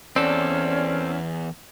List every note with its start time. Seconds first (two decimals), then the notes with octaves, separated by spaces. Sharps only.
0.16 E2 C4 C#4 A4 D5